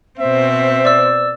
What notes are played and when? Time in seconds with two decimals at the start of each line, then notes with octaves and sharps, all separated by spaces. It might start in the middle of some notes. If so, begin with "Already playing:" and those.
0.19 B2 C4 C5 E5
0.85 D5 E6